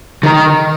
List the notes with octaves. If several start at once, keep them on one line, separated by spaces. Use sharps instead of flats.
D#3